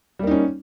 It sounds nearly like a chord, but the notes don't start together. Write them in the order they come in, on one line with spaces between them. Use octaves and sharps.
G3 A#3 D#4 C#4